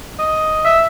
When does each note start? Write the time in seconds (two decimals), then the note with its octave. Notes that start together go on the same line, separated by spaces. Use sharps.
0.19 D#5
0.65 E5